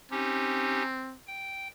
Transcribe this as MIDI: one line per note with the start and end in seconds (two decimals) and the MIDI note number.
0.11 1.15 60
0.11 0.83 61
0.11 0.83 63
0.11 0.83 67
1.27 1.68 79